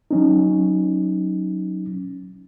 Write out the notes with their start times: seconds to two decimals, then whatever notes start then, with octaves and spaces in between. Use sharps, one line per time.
0.11 F#3 C#4 D#4